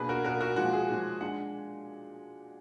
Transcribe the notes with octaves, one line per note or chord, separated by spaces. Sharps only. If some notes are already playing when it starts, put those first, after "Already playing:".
Already playing: B2 A#3 D4 G#4 B4
F#4 A#4
B2 A#3 D4 F#4 A#4
F#4 A#4
A#2 F3 G#3 F#4
G#4
A#2 F3 G#3
G#3 D4 F#5